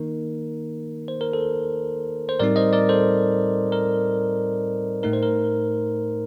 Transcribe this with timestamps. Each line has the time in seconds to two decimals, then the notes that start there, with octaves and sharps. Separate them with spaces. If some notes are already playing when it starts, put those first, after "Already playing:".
Already playing: D#3 A#3 D#4 A#4
1.08 C5
1.21 A#4
1.33 A4 C5
2.29 C5
2.40 A2 G3 C4 D#4 A#4 D5
2.56 C5 D#5
2.73 A#4 D5
2.89 A4 C5
3.72 A#4
5.03 A2 A3 D#4 A#4
5.13 C5
5.23 A#4